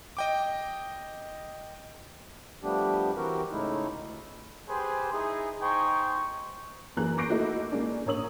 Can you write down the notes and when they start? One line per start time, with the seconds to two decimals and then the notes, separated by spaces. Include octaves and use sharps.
0.17 D#5 G5 D6
2.62 F3 G3 A3 B3 D4 G4
3.16 E3 C4 F#4 G4 A#4
3.52 A2 C#3 G#3 A3 D#4 E4
4.01 D2
4.69 G4 G#4 B4 C5
5.12 D#4 E4 G#4
5.61 D#4 C5 G5 G#5 C#6
6.97 F#2 E3 A#3 G#4 A#4 F#6
7.17 C#6 D6 G6 A#6 C7 D7
7.29 A3 A#3 D#4 E4 F#4 A4
7.72 G#3 A#3 C#4 D4
8.06 A#1 A#4 C#5 D#6 F#7